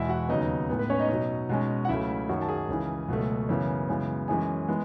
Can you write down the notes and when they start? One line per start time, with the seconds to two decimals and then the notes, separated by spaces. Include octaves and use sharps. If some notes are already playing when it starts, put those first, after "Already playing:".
Already playing: E2 B2 G#3 E4 E5
0.09 F#4 F#5
0.29 D#2 C#3 F#3 B3 D#4 D#5
0.69 A2 G#3 B3
0.79 B4
0.90 C#4 C#5
1.00 D#4 D#5
1.09 B2 F#3 C#4
1.49 B2 G#3 C#4
1.85 F#5
1.88 C#2 C#3 F#3 A3 E4 E5
2.29 F#2 D#3 F#3 F#4 F#5
2.42 A5
2.49 G#4 G#5
2.69 C#2 C#3 E3
3.08 C#2 B2 F#3 A3
3.49 F#2 C#3 E3 B3
3.88 F#2 C#3 E3 G#3 B3
4.28 F#2 E3 G#3 C#4 G#4 G#5
4.68 E3 G#3 B3